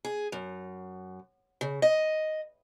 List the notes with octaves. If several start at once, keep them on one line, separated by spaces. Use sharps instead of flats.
G#4
F#2
C#3
D#5